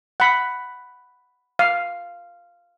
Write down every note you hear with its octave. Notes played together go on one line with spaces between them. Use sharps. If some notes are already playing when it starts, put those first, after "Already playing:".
F#5 B5
F5